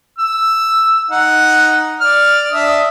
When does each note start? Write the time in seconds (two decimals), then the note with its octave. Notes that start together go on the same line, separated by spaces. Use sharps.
0.19 E6
1.11 D#4 F#5
2.01 D5 F6
2.52 D4 E5 D#6